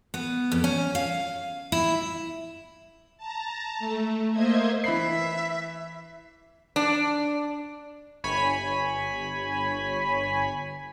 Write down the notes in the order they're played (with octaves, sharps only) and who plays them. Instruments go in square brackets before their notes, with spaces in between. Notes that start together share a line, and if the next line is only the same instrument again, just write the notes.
[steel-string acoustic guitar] B3
F2
C#4
F5
E4
[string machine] A5 A#5
A3
A#3 C5 D#5 E5 G#6
[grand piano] E3 B5 C7 [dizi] E5
[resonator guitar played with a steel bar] D4
[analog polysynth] G1 C#5 G#5 B5 B6